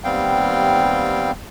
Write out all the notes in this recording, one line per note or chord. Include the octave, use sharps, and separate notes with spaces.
D#2 G3 B3 C4 F5 G5